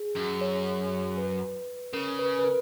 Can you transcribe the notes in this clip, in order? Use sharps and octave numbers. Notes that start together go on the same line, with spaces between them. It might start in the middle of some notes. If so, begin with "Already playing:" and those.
Already playing: G#4
F#2
C#5
B4
C#3 A#4
B4
B4
A#4